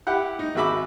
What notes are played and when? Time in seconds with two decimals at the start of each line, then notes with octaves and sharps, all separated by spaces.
0.07 E4 G4 F#5
0.39 D#4
0.55 G#1 G#3 F#4 E5 B5 D6